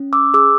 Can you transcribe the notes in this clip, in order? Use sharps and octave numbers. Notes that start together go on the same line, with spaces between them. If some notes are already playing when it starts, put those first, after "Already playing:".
Already playing: C#4
D6 E6
G#4 D6 E6